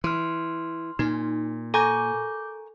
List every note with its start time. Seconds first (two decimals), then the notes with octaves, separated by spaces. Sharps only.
0.04 E3 C6 F6
0.99 A#2 D#4
1.74 A4 A#4 G#5 C#6 D6 G6